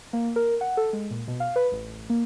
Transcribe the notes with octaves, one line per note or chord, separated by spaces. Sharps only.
A#3
A#4
F#5
A4
G#3
A#2
B2
F5
B4
A1
A#3